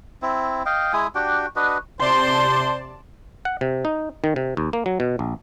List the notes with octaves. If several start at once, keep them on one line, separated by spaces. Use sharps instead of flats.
C4 E4
D#5 F5 G5
G#3 E4 G#5 D#6
D4 F#4 G4 G5
D4 F#4 B4 D#5
C3 C5 D5 A5 C6
F#5
C3
D#4
D#3
C3
D#2
A#3
F#3
B2
A#1